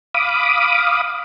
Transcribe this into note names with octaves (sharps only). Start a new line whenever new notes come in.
F5 B5 D6 D#6